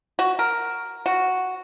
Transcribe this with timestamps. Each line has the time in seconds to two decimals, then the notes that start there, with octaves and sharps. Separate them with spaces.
0.19 F#4
0.39 A#4
1.06 F#4